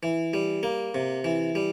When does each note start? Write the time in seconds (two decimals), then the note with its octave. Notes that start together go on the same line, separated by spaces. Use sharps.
0.03 E3
0.34 G3
0.63 A#3
0.95 C3
1.24 E3
1.55 G3